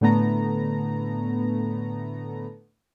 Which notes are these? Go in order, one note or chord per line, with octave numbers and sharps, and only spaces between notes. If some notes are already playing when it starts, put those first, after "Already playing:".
A2 D3 A3 B3 A#5